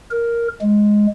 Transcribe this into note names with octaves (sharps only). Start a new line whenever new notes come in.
A#4
G#3